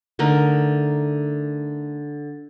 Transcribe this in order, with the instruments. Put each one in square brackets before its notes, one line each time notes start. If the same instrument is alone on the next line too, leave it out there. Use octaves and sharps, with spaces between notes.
[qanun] D3 A3 D#4 A#4